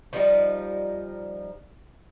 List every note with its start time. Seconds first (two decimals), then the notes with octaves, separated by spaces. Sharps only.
0.13 F3 G3 D#4